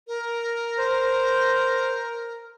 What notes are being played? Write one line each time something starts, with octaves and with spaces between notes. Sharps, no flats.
A#4
C5